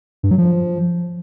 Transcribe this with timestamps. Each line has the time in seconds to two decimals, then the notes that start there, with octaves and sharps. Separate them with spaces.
0.23 G2
0.31 F#3
0.38 F3